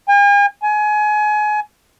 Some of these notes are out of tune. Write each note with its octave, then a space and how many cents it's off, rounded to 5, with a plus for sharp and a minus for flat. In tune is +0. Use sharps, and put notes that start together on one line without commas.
G#5 -45
G#5 +25